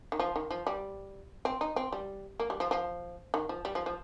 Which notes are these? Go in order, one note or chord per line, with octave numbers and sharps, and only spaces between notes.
D#3
F3
D#3
F3
G3
C4
D#4
C4
G3
A#3
G3
F3
F3
D#3
F3
G3
F3
F3